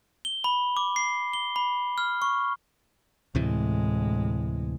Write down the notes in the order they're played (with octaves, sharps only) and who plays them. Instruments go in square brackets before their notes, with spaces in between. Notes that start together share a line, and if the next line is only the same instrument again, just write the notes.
[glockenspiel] G7
B5
D6
C7
G7
B5
F6
C#6
[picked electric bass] D2 C3 E3 [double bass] A2 G#3